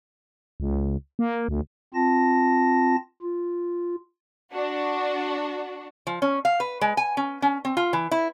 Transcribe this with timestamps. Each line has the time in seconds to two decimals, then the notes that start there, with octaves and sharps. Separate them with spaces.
0.60 C#2
1.19 A#3
1.49 D2
1.94 C4 F4 A5 A#6
3.22 F4
4.52 D4 F#4
6.07 F3
6.22 C#4
6.45 F5
6.60 B4
6.81 G#3
6.97 G#5
7.17 C#4
7.42 C#4
7.65 C4
7.77 F4
7.93 E3
8.11 E4